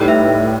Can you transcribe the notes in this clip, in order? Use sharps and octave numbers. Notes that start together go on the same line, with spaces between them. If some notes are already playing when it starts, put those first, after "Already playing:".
Already playing: A2 G3 D#4 G4 B4
E5